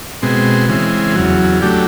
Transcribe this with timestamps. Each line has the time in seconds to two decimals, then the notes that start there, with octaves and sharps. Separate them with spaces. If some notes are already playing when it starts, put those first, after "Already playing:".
0.22 B2 G#3 C4
0.69 C#3 E3 G#3 C4
1.15 E2 C#3 F#3
1.62 F#3 A3 D4 G4